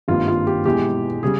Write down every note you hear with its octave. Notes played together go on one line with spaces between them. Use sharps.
G#1 G2 G3 A#3 F4
F4
G4
E1 E2 E3 G#3 G4
C#3 G3 G#4